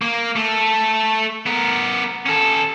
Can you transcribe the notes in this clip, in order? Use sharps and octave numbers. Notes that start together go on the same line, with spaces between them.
A#3
A3
B3 A#4
C#4 A4